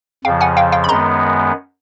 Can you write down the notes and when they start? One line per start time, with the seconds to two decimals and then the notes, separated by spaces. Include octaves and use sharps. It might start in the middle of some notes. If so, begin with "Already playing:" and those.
0.25 F2 C#3 F3 F5 G5
0.41 F#5 G#5
0.57 F5 G5
0.72 F5 G5
0.84 B5
0.88 F#2 D#3 G#3 B3 A#5 C6